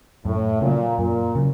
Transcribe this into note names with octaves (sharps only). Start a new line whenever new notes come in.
F#2 A2
A#2 C#3 F#3
F#2 A#2
C#3 F#3